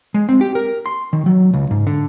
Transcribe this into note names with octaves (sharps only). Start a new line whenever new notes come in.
G#3
C4
G4
A#4
C6
D#3
F#3
C#2
G#2
D3